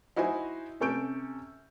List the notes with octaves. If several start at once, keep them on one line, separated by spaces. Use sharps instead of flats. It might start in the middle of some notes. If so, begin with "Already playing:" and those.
D#4 E4 F#4 C5 G#5
C3 C#4 A4 C#6 G6 D7